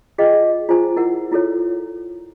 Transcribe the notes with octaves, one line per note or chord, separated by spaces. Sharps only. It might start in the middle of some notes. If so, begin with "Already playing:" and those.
F4 G#4 D#5 F5 G5
F4 G#4 C5 G#5 A#5
E4 A#4 F#5
E4 F4 A4 C#5